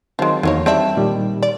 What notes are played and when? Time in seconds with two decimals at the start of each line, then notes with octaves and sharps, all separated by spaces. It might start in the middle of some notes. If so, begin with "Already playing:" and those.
0.19 D#3 F3 F#3 G#3 C4
0.43 E2 D#3 F#3 A#3 C#5
0.66 G3 C4 D4 E5
0.96 A#2 D#3 G3
1.43 D5